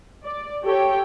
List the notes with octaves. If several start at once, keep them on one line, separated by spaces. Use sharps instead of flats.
D5
G4 A4 C#5 G5